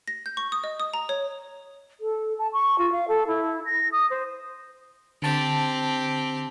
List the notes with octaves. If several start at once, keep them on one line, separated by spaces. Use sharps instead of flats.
A#6
G6
C#6
D#6
D#5
D#6
A#5
C#5
A4
A5
C#6
F4
F5
A4
E4
A#6
D#6
C5
D3 C4 G4 A5